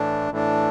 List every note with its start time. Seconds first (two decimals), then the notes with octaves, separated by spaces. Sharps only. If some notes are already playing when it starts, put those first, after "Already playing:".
Already playing: A2 E3 A3 D4
0.31 A2 E3 A3 D4